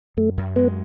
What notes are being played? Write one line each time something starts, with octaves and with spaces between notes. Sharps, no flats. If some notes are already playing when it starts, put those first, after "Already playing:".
F#2 A3
F#2
G#3 B3